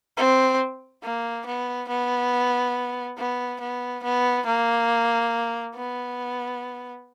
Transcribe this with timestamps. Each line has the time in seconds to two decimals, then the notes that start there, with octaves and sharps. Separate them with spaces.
0.18 C4
1.03 A#3
1.46 B3
1.89 B3
3.18 B3
3.61 B3
4.04 B3
4.46 A#3
5.75 B3